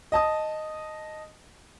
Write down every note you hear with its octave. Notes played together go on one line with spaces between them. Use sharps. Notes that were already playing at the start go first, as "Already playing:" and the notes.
D#5 A5 D#6